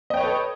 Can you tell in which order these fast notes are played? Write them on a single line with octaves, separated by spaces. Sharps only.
D#5 G5 C#5 B4 A4